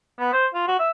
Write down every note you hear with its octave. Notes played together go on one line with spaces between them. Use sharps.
B3
C5
F4
F#4
E5